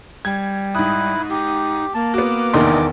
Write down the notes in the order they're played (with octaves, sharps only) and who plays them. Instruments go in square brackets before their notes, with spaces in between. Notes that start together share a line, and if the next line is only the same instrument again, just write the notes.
[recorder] G3 [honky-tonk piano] G#6
[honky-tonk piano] G#2 D#6 [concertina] E4 F#6
[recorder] D#4 [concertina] G4
[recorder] A#3 [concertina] A5
[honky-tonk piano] B3 F#4 [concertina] D6
[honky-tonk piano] F1 A#1 D#4 [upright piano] E2 D#3 C6